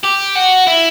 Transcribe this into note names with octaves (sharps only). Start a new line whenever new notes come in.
G4
F#4
E4